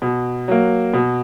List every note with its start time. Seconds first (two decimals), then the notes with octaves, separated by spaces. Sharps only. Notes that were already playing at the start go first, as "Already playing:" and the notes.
0.02 B2
0.48 F#3 A#3
0.94 B2